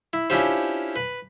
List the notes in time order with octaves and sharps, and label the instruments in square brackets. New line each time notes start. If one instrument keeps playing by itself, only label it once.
[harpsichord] E4
C#4 D4 E4 F4 G4 C5
B4